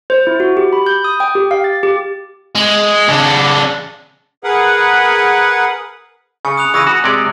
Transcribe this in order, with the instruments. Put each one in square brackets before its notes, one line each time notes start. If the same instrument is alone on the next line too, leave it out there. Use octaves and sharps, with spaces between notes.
[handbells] C5
E4
F#4
G4
B5
G6
D#6
G5
G4
F5
A6
G4
[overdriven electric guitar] G#3
C#3 D4
[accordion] G#4 A#4 B4 F#5
[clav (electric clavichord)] C#3 [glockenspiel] G#5 C#7
[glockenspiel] D#6 F#6 F7
[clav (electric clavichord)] C#3 E3 [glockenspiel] D#6 A#6 D#7
[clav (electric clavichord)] F#4
C3 G#3 D5